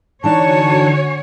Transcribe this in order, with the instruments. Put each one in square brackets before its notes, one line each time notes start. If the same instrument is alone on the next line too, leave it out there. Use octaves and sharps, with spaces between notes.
[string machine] D3 F#4 G#5 [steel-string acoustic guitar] E3 D4 D#4 [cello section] C#5 [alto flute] A5